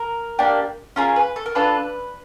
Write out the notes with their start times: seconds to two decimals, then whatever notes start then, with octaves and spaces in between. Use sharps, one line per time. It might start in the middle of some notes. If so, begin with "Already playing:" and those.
Already playing: A#4
0.39 A#3 D4 G4
0.96 C#4 F4 G#4 A#4
1.16 B4
1.36 A4
1.46 A#4
1.55 D4 F4 A4 B4